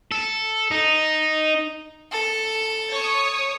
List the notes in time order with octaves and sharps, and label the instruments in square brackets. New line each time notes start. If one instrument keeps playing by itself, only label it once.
[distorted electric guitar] A4
D#4
[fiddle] A4 A5
[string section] C#5 C#6 D#6